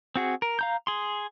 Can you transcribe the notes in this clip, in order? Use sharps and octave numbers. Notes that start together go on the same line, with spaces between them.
C4 F#4 G#4
A#4
F5 A#5 G6
G#4 C6